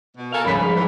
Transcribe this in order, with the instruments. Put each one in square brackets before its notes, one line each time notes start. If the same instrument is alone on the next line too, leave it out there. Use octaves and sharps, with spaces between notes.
[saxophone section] B2
[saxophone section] A4 A#4 [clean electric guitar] F5 G#5
[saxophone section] C#3 [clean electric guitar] F3 G3 [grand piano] B5 B6
[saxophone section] G#2
G#2 E3